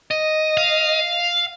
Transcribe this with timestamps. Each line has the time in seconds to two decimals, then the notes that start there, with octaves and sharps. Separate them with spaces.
0.11 D#5
0.57 F5